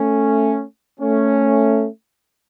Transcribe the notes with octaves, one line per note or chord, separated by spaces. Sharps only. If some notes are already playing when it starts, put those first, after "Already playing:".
Already playing: A3 C#4
A3 C#4